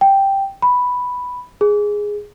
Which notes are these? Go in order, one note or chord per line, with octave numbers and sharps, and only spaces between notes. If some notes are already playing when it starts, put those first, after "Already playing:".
G5
B5
G#4